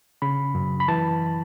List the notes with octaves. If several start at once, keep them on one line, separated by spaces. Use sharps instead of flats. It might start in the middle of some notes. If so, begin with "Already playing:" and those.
C#3 B5
F#2
B5
E3 A5